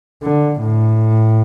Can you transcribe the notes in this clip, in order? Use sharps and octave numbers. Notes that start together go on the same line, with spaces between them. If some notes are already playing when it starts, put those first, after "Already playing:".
D3
A2